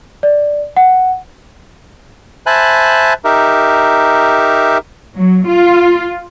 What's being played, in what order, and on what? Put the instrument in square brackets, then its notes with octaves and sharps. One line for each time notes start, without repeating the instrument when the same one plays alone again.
[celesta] D5
F#5
[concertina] C5 E5 G#5 A5 B5 F#6
D#4 G4 A#4 E5
[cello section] F#3
F4